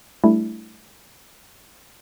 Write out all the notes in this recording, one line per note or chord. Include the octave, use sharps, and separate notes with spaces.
G3 A3 D4 E4